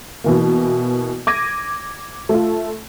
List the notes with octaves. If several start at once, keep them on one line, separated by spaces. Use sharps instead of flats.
B2 E3 A#3
D6 G#6 A#6 D#7
A3 F4